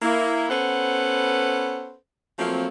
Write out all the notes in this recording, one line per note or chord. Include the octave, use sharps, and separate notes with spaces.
A#3 E4
B3 C#4 A4 B4 C5 F#5
F3 F#3 A3 A#3 C4